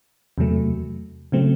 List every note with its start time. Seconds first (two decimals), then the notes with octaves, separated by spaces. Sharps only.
0.38 E2 C3 F#3 A3
1.32 C#3 F#3 A3 C4